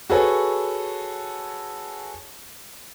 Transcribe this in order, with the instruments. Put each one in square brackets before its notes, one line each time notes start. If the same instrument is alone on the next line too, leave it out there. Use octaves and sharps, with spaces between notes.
[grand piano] F#4 G#4 A4 B4 C#5